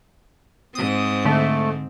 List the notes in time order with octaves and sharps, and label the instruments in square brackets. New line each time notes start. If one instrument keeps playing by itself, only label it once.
[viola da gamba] G#2 C4 [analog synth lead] D#6
[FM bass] D3 [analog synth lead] A3